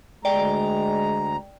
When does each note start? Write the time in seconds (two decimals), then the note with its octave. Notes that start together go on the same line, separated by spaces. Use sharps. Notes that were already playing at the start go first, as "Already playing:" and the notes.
0.25 D2 G#3 D5 G5 A#5